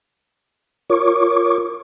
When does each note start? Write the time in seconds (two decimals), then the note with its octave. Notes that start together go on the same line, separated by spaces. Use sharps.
0.90 F4 A#4 C#5 C#6 D6